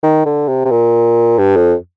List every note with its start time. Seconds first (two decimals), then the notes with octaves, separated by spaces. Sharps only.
0.03 D#3
0.25 D3
0.48 C3
0.65 C3
0.71 A#2
1.38 G2
1.56 F2